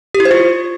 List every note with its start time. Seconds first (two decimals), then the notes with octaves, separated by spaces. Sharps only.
0.14 G4
0.20 E4
0.25 C5
0.31 F4